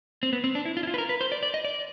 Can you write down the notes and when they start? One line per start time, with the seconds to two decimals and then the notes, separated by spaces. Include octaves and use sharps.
0.23 C4
0.33 B3
0.44 C4
0.55 D4
0.66 E4
0.77 F4
0.83 E4
0.87 F4
0.94 B4
0.98 A#4
1.09 B4
1.21 C5
1.32 D5
1.43 D5
1.54 D#5
1.65 D5